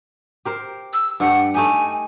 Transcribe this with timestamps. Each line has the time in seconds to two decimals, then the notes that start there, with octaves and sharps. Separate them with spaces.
0.45 G4 A#4 C5
0.93 E6
1.20 G2 A3 G4 F#5
1.54 A3 D#4 G4 G#5